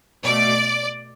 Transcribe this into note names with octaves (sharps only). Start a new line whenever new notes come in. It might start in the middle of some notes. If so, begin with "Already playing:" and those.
B2 A3 D5